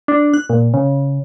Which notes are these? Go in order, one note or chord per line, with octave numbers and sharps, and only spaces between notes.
D4
F#6
A#2
C#3